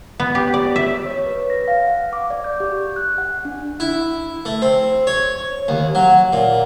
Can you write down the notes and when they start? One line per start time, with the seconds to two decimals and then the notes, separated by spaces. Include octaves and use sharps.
0.20 B3
0.35 G4
0.54 D5
0.76 E5
1.06 C#5
1.26 B4
1.50 A#6
1.68 F5
1.87 F#5
2.13 D6
2.30 D5
2.44 G6
2.60 G4
2.96 F#6
3.18 F#5
3.45 D4
3.80 E4
4.45 A3
4.62 C4
5.07 C#5
5.68 D#2
5.95 F#3
6.33 A#2